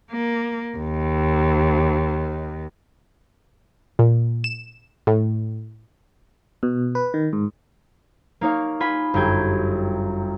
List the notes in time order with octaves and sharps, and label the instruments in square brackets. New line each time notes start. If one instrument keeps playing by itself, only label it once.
[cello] A#3
D#2
[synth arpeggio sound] A#2
E7
A2
[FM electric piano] B2
B4
D#3
G#2
[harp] A#3 D#4 C#5 F5
F4 G#5 B5
G1 F#2 G5 G#6